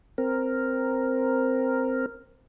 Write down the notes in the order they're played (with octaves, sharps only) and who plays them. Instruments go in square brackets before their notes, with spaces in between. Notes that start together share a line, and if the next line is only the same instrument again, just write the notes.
[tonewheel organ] C4 A#4